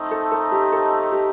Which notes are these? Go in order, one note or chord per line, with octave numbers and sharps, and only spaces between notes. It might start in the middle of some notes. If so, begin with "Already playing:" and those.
Already playing: A3 C4 D#4
A4
A4
G4
A4
G4